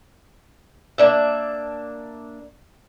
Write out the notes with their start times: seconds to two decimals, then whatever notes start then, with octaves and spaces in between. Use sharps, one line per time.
0.98 A#3 D4 E5